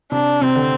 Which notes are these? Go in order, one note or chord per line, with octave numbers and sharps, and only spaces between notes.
C3 D4
C3 C4
D3